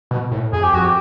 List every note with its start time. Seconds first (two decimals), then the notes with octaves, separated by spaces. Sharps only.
0.11 B2
0.31 A2
0.53 F2 G#4
0.64 G4
0.73 F2 F#4
0.85 G4